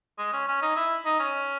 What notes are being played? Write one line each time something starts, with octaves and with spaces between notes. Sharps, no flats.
G#3
C#4
C#4
D#4
E4
D#4
C#4